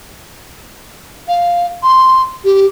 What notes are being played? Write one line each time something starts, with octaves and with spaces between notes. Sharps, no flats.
F5
C6
G4